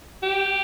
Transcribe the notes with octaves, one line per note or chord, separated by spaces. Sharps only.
G4